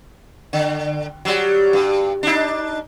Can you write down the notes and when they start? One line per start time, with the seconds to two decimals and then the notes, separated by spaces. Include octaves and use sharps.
0.53 D3
1.25 F#3 G3
1.73 G2
2.23 D4 D#4